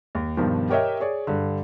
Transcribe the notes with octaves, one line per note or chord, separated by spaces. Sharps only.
D#2
G2 B2 D#3 F3
G4 A#4 C#5 D#5 E5 G5
G#4 C#5 D5
G2 D3